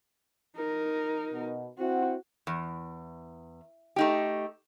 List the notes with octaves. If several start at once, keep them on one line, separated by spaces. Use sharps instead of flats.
D#4 A#4
B2
C4 E4 F#4 F#5
E2
A3 D#4 G4